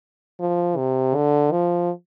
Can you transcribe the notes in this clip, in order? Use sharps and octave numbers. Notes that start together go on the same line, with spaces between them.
F3
C3
D3
F3